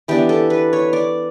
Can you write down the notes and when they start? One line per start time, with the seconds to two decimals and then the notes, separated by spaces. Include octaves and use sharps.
0.08 E3 B3 D4 G4
0.29 A4
0.50 B4
0.73 C#5
0.93 D5